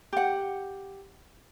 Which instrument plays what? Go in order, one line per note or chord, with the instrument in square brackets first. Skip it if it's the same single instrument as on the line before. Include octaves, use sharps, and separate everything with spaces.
[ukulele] G4 F#5